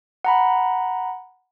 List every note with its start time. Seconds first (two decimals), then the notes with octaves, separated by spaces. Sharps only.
0.25 F#5 A#5 B5